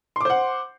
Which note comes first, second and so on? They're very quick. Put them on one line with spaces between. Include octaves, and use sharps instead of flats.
C6 D6 C5 F#5